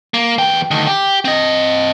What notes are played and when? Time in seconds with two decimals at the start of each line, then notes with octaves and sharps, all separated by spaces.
0.14 A#3
0.38 E2 G5
0.71 D2 D#3
0.87 G4
1.25 C4 D#5